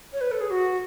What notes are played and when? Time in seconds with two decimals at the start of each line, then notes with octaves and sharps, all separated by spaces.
0.12 C#5
0.20 B4
0.31 A4
0.40 G#4
0.50 F#4